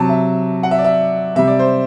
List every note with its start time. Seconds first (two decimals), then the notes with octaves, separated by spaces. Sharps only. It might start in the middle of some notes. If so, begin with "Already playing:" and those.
Already playing: C3 F#3 A5
0.09 E5
0.63 F#5
0.71 E5
0.78 D5
0.84 E5
1.35 C3 G3 E5
1.47 D5
1.59 C5